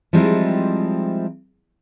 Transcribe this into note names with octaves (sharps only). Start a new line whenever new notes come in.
F3 G3 G#3 C4 D#4 E4